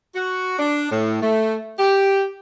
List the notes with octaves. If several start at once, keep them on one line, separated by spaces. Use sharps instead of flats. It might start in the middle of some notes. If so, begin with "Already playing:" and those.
F#4
D4
A2
A3
G4